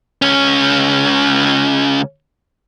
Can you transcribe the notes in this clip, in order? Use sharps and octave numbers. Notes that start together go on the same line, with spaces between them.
C#2 C#4